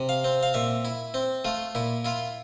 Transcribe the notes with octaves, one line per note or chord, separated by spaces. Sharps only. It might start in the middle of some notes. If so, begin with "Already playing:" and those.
Already playing: C3
F5
C4
F5
A#2 E5
E4
C4
A3 F4
A#2 E4
E4 F4